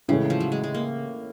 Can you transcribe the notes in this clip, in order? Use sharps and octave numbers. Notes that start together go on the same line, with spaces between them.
A2 C#3 E3 G#3 C#4
F3
F#3
G#3
G#3
A#3